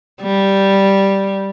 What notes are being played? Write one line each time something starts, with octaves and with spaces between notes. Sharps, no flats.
G3